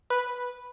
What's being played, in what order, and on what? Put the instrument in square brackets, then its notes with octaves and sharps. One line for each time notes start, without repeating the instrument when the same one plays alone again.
[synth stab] B4